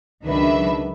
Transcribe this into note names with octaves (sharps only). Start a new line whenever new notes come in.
C#2 D#3 F#3 D4 B4 E5